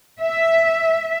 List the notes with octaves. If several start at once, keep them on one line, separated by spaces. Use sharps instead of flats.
E5